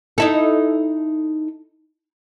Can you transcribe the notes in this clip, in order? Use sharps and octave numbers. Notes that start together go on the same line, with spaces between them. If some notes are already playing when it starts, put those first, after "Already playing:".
D#4 E4 A4